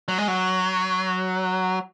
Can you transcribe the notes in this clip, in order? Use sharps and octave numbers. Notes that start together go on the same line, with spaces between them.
F#3
G#3
F#3